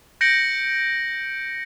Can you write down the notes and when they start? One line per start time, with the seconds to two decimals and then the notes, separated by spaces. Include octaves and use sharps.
0.21 G6 A#6 C#7 D7 F#7